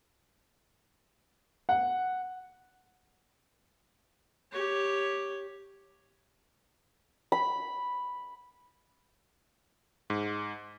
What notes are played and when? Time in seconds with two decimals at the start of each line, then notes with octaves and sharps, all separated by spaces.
1.69 F#5
4.52 G4 C#5
7.32 B5
10.10 G#2